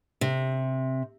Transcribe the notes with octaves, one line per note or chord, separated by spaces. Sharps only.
C3